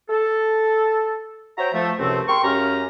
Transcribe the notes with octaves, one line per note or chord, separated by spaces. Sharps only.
A4
F#4 C5 C#5 E5 G5 A#5
F3 A3
C#2 F#2 C3 F3 A3 C4
A#4 G5 C6 C#6
F#2 G#3 C#4 G4 F5 A#5